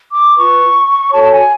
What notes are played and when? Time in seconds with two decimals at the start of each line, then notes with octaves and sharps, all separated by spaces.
0.11 D6
0.36 F4 B4 C#6
1.12 F#4 A4 C#5 A5
1.22 A5
1.31 G#5